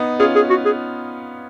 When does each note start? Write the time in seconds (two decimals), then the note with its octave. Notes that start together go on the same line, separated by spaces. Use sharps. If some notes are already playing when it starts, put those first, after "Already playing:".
Already playing: B3 D#4
0.20 C#4 F4 G#4
0.36 G#4
0.50 F#4
0.65 G#4